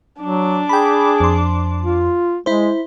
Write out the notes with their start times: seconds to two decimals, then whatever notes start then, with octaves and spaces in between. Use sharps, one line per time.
0.20 F#3 D4 D6
0.69 G#4 G5 B5
1.20 F2 C6
1.82 F4
2.46 G#3 E4 C5